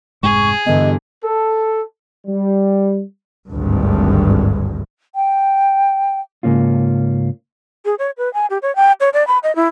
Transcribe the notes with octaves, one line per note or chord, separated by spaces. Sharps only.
F1 G#2 G#3 G#4 C#6
G2 D3 E3 B3 D#5
A4
G3
G#1 D2 G2
G5
G#2 C#3 A#3 C#4 F4
G#4
C#5
B4
G#5
G4
C#5
G5
C#5
D5
B5
D#5
E4